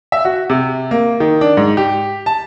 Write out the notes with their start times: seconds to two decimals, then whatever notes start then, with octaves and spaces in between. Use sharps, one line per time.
0.12 E5
0.25 F#4
0.50 C3
0.91 A#3
1.20 D#3
1.41 D4
1.57 G#2
1.77 G4
2.26 A5